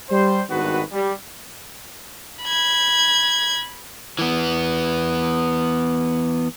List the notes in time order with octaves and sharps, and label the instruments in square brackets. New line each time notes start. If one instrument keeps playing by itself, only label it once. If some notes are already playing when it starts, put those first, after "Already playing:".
[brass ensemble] G3 C5
G#1 G2 D#3 B3 F#4 B4
G3
[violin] B5 G#6
[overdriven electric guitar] E3 B3